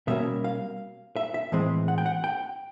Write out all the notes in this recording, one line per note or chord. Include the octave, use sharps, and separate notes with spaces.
B2 G3 A#3 C#4 E5
F5
E5
E5
A2 E3 G#3 C4
F#5
G5
F#5
G5